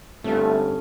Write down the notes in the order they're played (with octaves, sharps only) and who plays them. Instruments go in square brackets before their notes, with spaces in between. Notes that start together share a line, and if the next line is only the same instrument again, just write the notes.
[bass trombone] G1 [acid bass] A3 [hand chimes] C4 A4 A5 [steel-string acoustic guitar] C#4